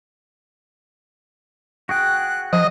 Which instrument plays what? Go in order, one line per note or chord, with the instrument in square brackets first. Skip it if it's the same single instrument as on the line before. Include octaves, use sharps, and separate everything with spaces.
[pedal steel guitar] F#4 G#4 G5 [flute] F#6
[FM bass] F3 [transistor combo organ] D#5